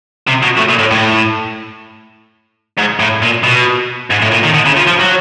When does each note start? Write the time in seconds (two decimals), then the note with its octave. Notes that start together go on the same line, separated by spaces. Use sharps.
0.27 C3
0.42 B2
0.57 A2
0.69 A#2
0.79 A2
0.91 A2
2.78 G#2
3.00 A2
3.23 A#2
3.44 B2
4.11 G#2
4.22 A2
4.32 A#2
4.44 D#3
4.54 D3
4.66 C#3
4.77 F3
4.87 F3
5.00 F#3